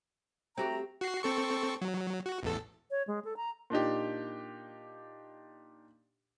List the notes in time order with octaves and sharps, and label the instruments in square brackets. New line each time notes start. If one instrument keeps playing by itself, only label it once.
[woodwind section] A3 A#5 [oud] C4 F#4 G4
[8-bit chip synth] F#4 C7
C4 A4 C#6
F#3
F#4
A1 E2 A4
[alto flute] C#5
G#3
A4
A#5
[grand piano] A#2 D4 D#4 G4